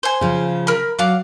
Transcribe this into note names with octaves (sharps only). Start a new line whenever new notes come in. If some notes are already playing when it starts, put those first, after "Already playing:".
C5 G#5
C#3 F3
A#4 B5
F#3 F5 F#5 D6